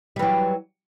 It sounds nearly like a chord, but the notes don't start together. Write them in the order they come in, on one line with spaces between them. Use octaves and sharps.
G3 E3 F#3